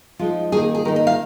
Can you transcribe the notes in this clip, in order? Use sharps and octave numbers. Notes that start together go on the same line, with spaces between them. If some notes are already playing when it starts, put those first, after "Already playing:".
F3 G#3 D#4 F4
D#3 A#3 D#4 G#4
G#4
D#3 A#3 D#4 A#4
D#5
F5